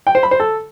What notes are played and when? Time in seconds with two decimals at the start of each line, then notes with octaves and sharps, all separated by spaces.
0.07 G5
0.15 C5
0.23 B5
0.31 C5
0.40 A4